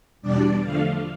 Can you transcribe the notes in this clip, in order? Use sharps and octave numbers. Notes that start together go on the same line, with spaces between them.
E2 B2 G3 D4 D5
D3 F3 A3 F5